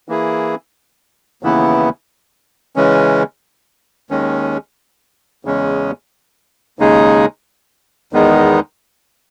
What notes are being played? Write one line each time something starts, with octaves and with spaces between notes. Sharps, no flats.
E3 A#3 E4 G#4
D#2 C#3 E3 B3 E4
C#3 E3 G#3 C#4
D#2 D#3 G#3 C#4
E2 C#3 G#3 C#4
D#2 C#3 G#3 D#4 G#4
E2 D#3 G#3 B3 D#4